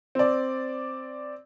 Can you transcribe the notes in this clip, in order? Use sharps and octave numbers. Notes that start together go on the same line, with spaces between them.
C4 D5